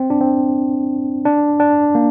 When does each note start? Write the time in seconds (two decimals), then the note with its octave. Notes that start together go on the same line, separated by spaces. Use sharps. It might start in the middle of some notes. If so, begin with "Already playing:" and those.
Already playing: C4
0.10 D4
0.21 C4
1.25 D4
1.60 D4
1.95 A#3